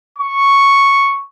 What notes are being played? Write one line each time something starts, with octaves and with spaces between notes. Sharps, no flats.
C#6